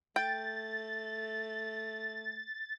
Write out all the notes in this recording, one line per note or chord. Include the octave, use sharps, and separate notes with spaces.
A3 G5 A6